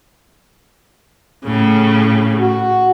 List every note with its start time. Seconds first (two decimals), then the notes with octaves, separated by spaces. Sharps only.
1.45 A2 C#3
2.40 F#4